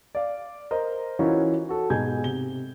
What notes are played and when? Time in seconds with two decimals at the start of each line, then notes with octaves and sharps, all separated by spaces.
0.15 D5 F5
0.71 A#4 C5 D#5
1.19 E3 C#4 D#4 F4 F#4 A#4
1.69 F#4 A4
1.90 G#2 B2 G#4 G#5 G6 G#6
2.24 C3 G7